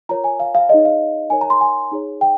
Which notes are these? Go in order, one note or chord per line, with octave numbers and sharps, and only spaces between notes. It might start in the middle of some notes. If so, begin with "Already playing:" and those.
F4 A#4 C#5 A#5
G#5
F5
F5
D#4 G#4 C#5 D#5
F5
D#4 A#4 C#5 G#5
A#5
C6
G#5
D#4 G#4 C#5
G5